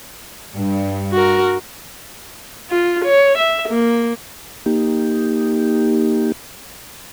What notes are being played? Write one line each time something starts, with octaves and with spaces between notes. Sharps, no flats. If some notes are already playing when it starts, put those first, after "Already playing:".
G2
F#4 A#4
F4
C#5
E5
A#3
A#3 D#4 G4